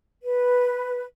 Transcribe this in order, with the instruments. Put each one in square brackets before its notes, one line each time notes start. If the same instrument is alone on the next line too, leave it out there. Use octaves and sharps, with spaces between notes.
[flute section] B4